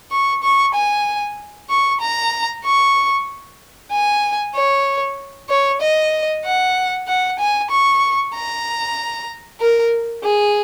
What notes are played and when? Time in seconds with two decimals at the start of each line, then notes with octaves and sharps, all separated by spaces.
0.11 C#6
0.43 C#6
0.74 G#5
1.70 C#6
2.01 A#5
2.65 C#6
3.92 G#5
4.55 C#5
5.49 C#5
5.82 D#5
6.45 F#5
7.08 F#5
7.39 G#5
7.71 C#6
8.35 A#5
9.61 A#4
10.24 G#4